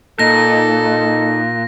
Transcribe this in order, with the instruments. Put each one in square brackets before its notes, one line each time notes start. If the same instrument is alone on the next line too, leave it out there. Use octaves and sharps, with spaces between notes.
[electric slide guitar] A#2 [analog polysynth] D#4 [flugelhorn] A4 [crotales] A#6